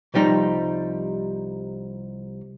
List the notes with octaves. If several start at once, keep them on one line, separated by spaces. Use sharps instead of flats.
C2 F3 G3 D#4